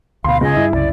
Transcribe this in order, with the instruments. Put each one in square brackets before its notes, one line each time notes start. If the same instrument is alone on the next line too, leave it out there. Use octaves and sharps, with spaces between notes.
[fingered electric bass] D2 B2 [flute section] F5 [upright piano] B5 C6
[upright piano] C#2 [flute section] G#4 D#5
[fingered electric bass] G2 [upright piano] E4
[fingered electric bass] C2 F#2 C#3 [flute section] D5